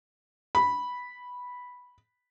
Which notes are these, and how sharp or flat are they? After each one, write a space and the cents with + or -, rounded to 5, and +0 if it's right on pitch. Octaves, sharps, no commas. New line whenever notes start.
B5 -5